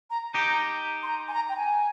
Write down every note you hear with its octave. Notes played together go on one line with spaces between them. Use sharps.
A#5
D#4 G4 A#5
C6
A#5
G#5
A#5
G5
G#5